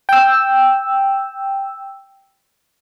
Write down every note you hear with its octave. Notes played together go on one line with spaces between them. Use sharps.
G5 E6